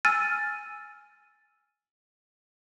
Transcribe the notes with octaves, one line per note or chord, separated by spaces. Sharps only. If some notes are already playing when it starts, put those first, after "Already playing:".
G#5 E6 F6 A6 D#7